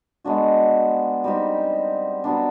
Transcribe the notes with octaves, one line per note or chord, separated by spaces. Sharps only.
G#3 B3 D4 F#4
G3 C4 D#4 G4
F#3 B3 D4